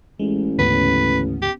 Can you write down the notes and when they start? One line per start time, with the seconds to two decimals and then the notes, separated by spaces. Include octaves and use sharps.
0.19 A1 G#3
0.59 D2 G#2 C#3 B3 C#4 B4
1.42 G4